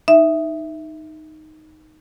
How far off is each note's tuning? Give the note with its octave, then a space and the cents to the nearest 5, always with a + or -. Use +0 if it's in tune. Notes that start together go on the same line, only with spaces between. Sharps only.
D#4 +0 E5 +0